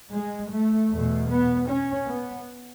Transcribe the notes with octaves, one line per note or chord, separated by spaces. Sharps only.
G#3
A3
E2 B2 A3
B3
C#4
B3